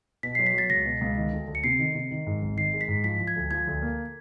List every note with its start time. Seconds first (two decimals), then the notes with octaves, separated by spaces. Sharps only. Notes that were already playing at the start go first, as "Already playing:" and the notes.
0.23 B2 B6
0.35 F#3 C7
0.46 B6
0.54 F#3 A6
0.69 C#2 A#6
0.85 B2
1.01 C#2
1.17 D#3
1.33 D2
1.47 D2
1.55 C#7
1.64 C3 C7
1.79 D#3
1.95 C3
2.11 D#3
2.27 G#2
2.42 G#1
2.57 D#3 C7
2.73 G#3
2.81 B6
2.88 G#2
3.04 F3 B6
3.20 F3
3.27 G#6
3.36 D2
3.51 F3 G#6
3.67 D2
3.82 A#3